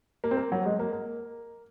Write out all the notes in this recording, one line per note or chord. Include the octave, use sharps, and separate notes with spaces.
A#3
C4
A#3
F#3
G#3
A#3
A#3